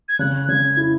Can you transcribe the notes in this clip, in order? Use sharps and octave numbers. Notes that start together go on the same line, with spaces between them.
G#6
C#3 F#6
C#3 G#6
E4